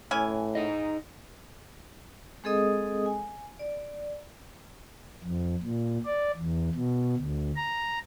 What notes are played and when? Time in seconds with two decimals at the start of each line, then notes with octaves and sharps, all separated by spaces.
0.11 A2 E3 C#4 G#5
0.55 D#4 G#4 D#5
2.44 G#3 C4 G#4 A4 D#5 D#6
3.06 G#5
3.59 D5
5.24 F2
5.63 A#2
6.05 D5
6.38 E2
6.75 B2
7.17 D2
7.56 A#5